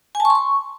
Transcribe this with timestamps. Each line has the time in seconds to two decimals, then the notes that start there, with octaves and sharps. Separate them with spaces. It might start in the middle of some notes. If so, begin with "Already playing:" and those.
0.15 G#5
0.20 A5
0.25 C#6
0.30 C6
0.35 C#6